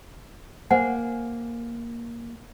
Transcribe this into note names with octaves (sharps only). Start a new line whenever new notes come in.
A#3 C5 F#5 G#5